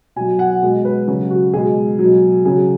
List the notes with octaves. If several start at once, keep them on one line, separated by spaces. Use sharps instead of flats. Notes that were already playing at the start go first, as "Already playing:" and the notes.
B2 F#3 G#5
F#5
B2 G#3
B4
C#3 F#3 F#4
F#4
B2 G#3 G#4
F#3
B2
C#3 F#3 G#4